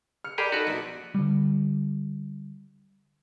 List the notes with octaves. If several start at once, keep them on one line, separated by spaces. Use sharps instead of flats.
F6 C#7
G4 G#4 A#4 D5 B5
D#4 F#4 A4 B4
A#1 B2
D3 G3